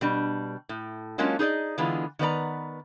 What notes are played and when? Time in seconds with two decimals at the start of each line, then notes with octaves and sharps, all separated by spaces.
0.01 B2 G3 D4
0.69 A2
1.18 F#3 G#3 A#3 C#4 D4 F4
1.39 D#4 G#4 B4 D5 D#5
1.78 D3 E3 G#3 B3 F4
2.19 D#3 B3 B4 D5 A#5